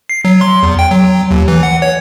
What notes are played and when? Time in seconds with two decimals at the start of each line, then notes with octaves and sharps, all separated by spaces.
0.09 C7
0.25 F#3
0.41 C6
0.63 E2
0.79 G5
0.91 F#3
1.31 D#2
1.48 E3
1.63 F#5
1.82 C#5